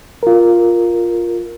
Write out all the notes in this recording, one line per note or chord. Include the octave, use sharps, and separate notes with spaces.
F4 A#4